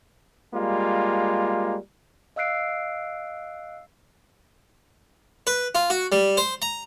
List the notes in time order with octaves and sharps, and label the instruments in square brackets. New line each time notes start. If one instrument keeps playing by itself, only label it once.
[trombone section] G3 G#3 A#3 F4
[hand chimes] D#5 F5 E6 F#6 C7 D7
[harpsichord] B4
F4
F#4
G3
C5
A#5